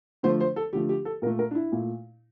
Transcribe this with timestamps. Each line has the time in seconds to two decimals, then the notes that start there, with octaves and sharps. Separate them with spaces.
0.23 D3 F3 A3 C5
0.40 C5
0.56 A4
0.73 D3 F3 A3 G4
0.89 G4
1.05 A4
1.22 A#2 A#4
1.27 A3
1.39 A#4
1.51 D4
1.55 E4
1.72 A#2 A3